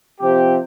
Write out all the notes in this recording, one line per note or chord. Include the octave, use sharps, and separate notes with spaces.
C3 F3 C4 G4